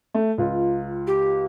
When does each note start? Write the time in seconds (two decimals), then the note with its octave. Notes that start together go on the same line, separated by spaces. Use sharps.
0.14 A3
0.38 C#2 F4
1.07 G4